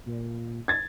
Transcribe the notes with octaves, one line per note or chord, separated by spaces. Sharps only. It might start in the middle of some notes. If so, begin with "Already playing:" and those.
A#2
G#6 A6